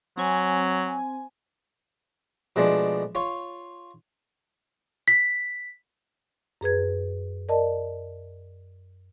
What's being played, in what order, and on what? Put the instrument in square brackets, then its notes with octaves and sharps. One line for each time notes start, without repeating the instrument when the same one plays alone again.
[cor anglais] F#3 [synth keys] C4 G#5
[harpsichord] B2 F3 G#3 A3 D4 D5
F4 C#5
[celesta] B6
[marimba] F#2 G#4 B4 G#6
A#4 D5 D#5 A5